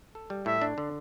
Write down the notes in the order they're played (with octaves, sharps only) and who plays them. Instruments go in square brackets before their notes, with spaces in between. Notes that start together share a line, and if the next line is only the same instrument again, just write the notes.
[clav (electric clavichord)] A4
G3
[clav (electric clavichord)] A2 [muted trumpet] E5
[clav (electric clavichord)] D4
D3